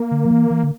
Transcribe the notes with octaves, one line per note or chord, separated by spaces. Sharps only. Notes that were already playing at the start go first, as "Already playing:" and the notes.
Already playing: A#3
D3
F3
E3
E3
D3